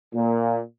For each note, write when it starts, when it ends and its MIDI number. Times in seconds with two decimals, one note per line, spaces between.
0.14 0.59 46